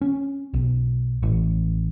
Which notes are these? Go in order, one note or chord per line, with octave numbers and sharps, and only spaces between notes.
C#4
B1
A1